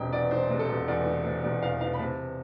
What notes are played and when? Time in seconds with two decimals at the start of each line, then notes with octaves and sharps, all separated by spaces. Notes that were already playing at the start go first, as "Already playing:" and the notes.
Already playing: E1 C3 G5
0.12 E2 D5
0.31 E3 C5
0.50 C3
0.59 A4
0.69 E1
0.88 E2 D5
1.06 E3
1.25 C3
1.44 E1 D5
1.62 E2 F5
1.81 E3 F5
1.93 B5
1.99 C3 A5